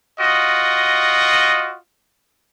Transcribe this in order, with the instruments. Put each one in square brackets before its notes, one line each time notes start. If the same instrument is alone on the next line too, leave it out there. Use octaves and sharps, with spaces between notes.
[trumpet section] F4 F#4 D#5